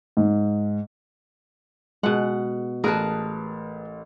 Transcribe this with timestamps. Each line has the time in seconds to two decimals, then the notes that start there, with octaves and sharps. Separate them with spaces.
0.17 G#2
2.03 B2 G#3 F#5
2.84 A1 G#4 A#4 B4 A5